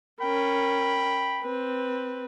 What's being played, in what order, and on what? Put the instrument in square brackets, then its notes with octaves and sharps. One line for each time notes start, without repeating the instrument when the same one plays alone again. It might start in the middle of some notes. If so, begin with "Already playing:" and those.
[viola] C#4 A#4 [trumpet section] G5 B5
[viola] C4 B4